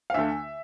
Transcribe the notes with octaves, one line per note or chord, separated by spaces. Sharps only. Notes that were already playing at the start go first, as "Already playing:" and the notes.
F5
D2 D3 A3 E5